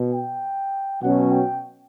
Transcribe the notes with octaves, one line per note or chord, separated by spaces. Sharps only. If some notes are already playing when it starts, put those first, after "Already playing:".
Already playing: B2
G5
B2 F#3 C#4 F#4 F#5
G5